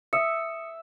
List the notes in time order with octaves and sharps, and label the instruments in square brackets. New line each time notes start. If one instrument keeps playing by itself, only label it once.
[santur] E5 [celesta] D#6 C#7